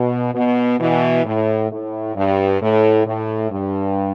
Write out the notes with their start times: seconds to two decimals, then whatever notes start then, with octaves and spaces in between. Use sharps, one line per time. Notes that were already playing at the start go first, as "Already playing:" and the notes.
Already playing: B2
0.34 B2
0.79 B2 E3
1.24 A2
1.70 A2
2.15 G2
2.60 A2
3.05 A2
3.50 G2